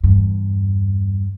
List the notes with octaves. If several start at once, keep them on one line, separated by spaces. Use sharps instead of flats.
E2 G2